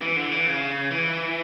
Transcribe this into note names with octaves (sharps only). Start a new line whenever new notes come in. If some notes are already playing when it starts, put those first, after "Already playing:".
E3
D3
E3
C#3
E3